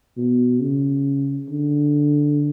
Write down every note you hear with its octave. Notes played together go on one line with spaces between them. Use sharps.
B2
C#3
D3